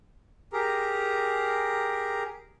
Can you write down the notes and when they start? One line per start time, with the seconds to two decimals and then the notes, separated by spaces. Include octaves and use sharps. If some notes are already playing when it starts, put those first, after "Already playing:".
0.53 G4 G#4 A#4 A#5